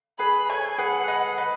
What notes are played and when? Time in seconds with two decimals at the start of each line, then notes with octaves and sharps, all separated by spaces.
0.19 G#4 B4 B5
0.49 A4 C#5 G#5
0.78 G#4 B4 F#5
1.08 B4 D#5
1.38 B4 D#5